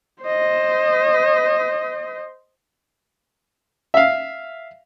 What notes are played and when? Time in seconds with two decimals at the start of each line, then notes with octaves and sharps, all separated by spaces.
0.23 C5 D#5
3.94 E5 F5